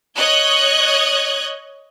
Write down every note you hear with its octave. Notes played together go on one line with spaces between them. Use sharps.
C#5 D#5 F#6 G#6